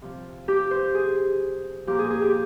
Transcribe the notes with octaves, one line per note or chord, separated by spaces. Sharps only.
C3 F3
G4
C5
G#4
A#2 F3 G4
G#4
G#4
G4